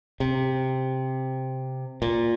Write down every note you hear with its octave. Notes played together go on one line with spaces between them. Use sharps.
C3
A#2